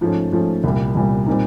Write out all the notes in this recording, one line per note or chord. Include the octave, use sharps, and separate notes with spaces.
G#2 F3 A3 C#4
G#2 F3 A3 C#4
C2 A#2 G3
C2 A#2 G3
A#2 G3 C4 D#4